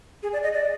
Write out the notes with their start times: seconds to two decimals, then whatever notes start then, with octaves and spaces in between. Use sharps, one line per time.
0.23 G#4
0.33 D5
0.43 D#5
0.54 D5